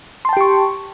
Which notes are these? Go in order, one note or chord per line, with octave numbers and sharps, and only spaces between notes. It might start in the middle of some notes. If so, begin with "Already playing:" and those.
G4 G5 A5 C6 C#6